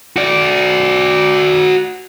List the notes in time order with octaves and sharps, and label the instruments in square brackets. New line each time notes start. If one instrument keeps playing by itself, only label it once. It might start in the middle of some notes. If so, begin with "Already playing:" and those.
[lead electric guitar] F#4 D5